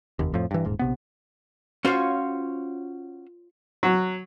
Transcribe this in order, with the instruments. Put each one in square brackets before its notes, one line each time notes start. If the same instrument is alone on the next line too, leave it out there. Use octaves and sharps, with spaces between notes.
[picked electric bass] F1 D#2
F2 A2 F3
G2 E3
D#1 G#2
A#1 C3 B3
[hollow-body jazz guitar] C#4 F#4 C5 [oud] F4 C#5
[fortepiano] F#3